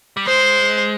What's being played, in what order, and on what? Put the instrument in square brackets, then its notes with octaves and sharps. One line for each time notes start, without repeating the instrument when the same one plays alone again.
[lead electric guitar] G3
[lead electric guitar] G#3 [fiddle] C5